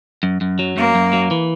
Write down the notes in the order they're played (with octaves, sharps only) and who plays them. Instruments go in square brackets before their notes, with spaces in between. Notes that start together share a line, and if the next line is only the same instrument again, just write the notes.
[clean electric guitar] F#2
F#2
F#3
[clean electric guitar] F#2 [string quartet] A#3
[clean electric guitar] F#2
F#3
E3